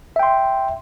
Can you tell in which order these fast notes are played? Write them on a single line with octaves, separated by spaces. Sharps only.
E5 G5 C6